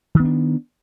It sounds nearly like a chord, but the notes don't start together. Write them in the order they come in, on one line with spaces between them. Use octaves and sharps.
D#3 B3 D4